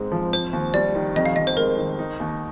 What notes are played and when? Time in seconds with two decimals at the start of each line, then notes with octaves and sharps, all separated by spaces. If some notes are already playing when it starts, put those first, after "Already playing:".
Already playing: G#2 G#3 C4
0.12 F3
0.32 C4 C5
0.53 D#2
0.74 G3 D5
0.95 D#3
1.16 F2 D#5
1.26 F5
1.36 F2 D#5
1.47 C5
1.57 G#3 A#4
1.78 D#3
1.99 D#4
2.20 D#2